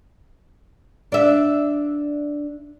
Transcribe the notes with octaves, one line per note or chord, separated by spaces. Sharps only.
D4 E5